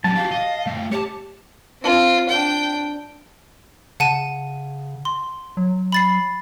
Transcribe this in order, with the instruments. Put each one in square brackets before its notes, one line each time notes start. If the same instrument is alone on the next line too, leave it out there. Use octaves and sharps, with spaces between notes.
[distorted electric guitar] F#3 G4 [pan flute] C#4 [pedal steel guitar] A5
[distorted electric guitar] F#4 G4 [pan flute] F5
[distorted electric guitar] D#5
A3 F4
[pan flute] G4 [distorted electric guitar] C#5 A5
[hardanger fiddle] C4 F4
D4 G5
[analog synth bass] C#3 [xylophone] F#5 A5 D#7
[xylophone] C6
[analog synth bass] F#3
[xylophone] B5 A6 C7